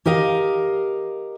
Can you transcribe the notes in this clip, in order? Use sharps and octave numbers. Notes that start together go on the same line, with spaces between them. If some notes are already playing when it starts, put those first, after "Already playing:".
G4 A#4 D#5 F5